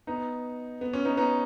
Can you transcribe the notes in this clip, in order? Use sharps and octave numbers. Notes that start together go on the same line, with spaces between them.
B3 D#4
B3
C#4
B3 D#4
B3 D#4